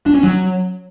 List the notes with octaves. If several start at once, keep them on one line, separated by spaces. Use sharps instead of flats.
D4
C#4
F#3